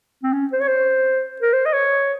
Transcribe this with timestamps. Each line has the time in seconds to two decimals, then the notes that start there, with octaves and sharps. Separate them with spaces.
0.23 C4
0.33 C#4
0.53 C5
0.61 C#5
0.68 C5
1.41 A#4
1.53 C5
1.66 D#5
1.73 C#5